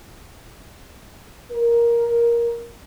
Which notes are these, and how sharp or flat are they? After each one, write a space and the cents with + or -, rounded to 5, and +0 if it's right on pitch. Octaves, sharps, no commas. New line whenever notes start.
A#4 +10